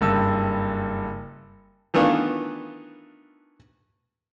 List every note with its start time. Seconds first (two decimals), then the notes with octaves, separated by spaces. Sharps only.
0.01 F#1 G2 E6
1.94 D#3 E3 A3 B3 D4 F4